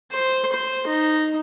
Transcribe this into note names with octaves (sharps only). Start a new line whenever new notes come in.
C5
C5
D#4